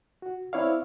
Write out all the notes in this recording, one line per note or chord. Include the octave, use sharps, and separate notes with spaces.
F#4
C4 E4 C#5 D5 F5